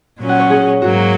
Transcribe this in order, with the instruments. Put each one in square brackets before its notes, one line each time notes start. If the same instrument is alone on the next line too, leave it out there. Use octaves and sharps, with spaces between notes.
[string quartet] A#2 F#3 C#4
[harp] F#5
C#5
G#4
[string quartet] G#2 F#3 A#3 [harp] F#4